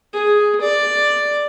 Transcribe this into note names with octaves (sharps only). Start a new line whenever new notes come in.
G#4
D5